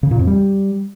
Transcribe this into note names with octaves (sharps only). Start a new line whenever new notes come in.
C#3
A#2
F2
G3